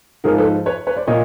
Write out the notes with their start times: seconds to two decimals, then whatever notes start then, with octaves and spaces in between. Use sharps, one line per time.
0.24 G#2 F3 G#4 A#4
0.38 A4 B4
0.66 B4 C#5
0.87 B4 C#5
0.96 C5 D5
1.07 A#2 F3 C#5 D#5